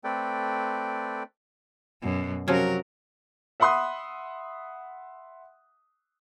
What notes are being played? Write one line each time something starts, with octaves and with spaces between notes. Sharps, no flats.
A3 C4 A4 B4 D5 G5
F#2 B2
C3 F3 F#3 C#4 A#4
E5 F#5 B5 C6 D#6 F#6